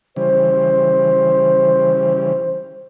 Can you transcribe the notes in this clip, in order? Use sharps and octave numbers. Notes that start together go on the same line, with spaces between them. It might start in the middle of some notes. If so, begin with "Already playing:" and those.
C#3 E3 G3 C5